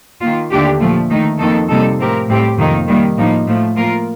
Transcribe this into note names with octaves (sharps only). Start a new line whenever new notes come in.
D#3 A#3 F4
D#2 D3 A3 D4 G4
A#2 F3 A3
D#3 A3 D#4
F2 D#3 A#3 D#4 A4
C3 G3 A#3 D#4 A4
A2 F3 C4 G4 A#4
A2 G3 C4 G4
F2 C3 D#3 A#3 D#4
D#3 G3 A#3
A2 F3 A#3 D#4
A2 F3 A3
F3 A#3 F4 A#4